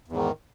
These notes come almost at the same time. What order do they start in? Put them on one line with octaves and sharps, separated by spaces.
E2 G#2 D#3